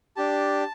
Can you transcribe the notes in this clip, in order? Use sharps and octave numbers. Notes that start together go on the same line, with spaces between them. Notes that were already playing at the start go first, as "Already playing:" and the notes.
D4 G4 A5